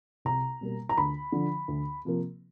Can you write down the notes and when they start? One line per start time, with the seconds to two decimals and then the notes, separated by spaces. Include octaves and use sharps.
0.25 C2 A#5
0.61 B2 G3 A#3
0.89 A#5
0.98 D2 B5
1.32 D3 F3
1.68 D2
2.05 C3 F3 A#3